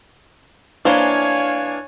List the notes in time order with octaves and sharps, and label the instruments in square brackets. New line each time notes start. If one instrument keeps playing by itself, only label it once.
[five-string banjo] E3 A#3 C5 [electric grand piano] D4 F5 [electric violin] C#5 G#5